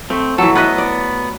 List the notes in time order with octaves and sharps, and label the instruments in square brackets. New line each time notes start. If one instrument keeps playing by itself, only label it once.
[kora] A3 [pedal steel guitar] C4
[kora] E3 F#3 [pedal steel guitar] A4
[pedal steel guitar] B3 F#6 [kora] B4 D#5 E5
[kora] D5